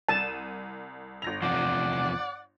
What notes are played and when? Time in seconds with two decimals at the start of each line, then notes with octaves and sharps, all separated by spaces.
0.09 C2 A5 D#7 E7
1.22 G1 A#6 F7
1.42 E2 C3 F3 D5 F#5